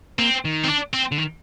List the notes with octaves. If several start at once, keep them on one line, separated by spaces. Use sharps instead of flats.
A#3 C4
D#3
C4
D4
C4
D3
D#3